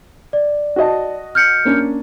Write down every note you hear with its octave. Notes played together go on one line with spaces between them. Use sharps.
D5
F#4 D#5 A5
F6 G6 C#7
A#3 C#4 D4